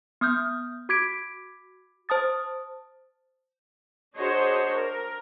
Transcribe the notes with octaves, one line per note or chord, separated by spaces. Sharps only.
B3 D#6 F6 G6
F#4 D6 G#6 B6 D7
C5 A5 D#6 A6
D4 F#4 G#4 C5 C#5 D#5
A#4